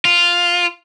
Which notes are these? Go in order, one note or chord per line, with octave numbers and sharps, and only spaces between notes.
F4